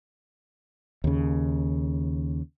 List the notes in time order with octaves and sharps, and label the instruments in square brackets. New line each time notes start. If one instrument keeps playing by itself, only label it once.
[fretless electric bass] D#2 C#3